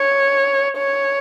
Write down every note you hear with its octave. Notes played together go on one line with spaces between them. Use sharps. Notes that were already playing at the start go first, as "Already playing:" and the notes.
Already playing: C#5
C#5